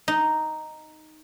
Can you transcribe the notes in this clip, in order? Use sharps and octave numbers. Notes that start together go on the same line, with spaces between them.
D#4